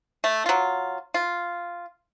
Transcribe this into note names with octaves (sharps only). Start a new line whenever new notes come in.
A3
F#3 F4
F4